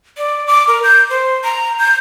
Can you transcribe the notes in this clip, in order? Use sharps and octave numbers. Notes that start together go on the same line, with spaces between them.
D5
D6
A#4
G6
C5
A#5
G6